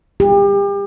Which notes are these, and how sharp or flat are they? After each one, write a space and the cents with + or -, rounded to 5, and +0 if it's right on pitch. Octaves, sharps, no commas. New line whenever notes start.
G4 +35